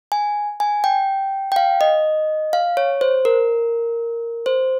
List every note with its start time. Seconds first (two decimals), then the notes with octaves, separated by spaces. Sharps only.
0.12 G#5
0.60 G#5
0.84 G5
1.52 G5
1.56 F5
1.81 D#5
2.53 F5
2.77 C#5
3.01 C5
3.25 A#4
4.46 C5